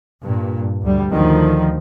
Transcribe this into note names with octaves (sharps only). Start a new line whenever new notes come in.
G2 A#2
D2 G3
D2 D#3 F3